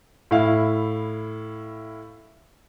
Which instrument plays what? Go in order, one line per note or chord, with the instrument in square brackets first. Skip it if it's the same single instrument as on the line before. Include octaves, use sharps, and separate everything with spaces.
[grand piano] A2 E4 F5